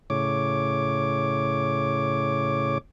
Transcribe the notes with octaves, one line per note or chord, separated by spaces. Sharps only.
A2 C#3 C#5 D6